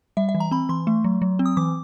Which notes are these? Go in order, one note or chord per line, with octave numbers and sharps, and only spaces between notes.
G3 E5
E5
E3
A#5
C4 B5
E3 C6
A3
F#3
F#3
C4
D#6
E3 D6